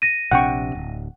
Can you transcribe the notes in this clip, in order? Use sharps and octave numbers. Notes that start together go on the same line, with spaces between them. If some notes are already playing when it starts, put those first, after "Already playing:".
A#6 D#7
A#1 C3 D4 F#5 G5 C#6
D1